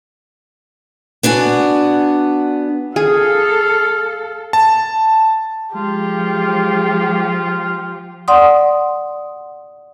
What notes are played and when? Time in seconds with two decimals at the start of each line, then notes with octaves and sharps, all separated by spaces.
1.23 B3 D4 F#4 G#5
2.96 G#4 A4 F5
4.53 A5
5.75 F3 G#3 F4 G4
8.28 D5 F#5 C6 D#6